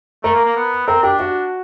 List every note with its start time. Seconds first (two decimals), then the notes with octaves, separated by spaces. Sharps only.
0.23 A3 A#4
0.34 A#3
0.45 A#3
0.56 B3
0.87 C4 A#4
1.03 D4 G4
1.19 F#4